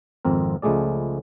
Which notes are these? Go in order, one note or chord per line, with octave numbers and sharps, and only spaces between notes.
G#1 F2 C4 A#4
C#2 F3 G#3 A3 G#4 D5